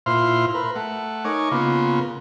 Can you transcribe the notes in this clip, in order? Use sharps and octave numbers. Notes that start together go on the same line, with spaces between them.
A#2 E4 F4 C5 C6 F6
A#4 B4
A3 F#5
D#4 A#4 C#5 G#5 C#6 D6
C#3 A#3 B3 F4